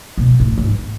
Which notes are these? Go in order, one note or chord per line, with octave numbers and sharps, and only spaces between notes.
B2
A2
G#2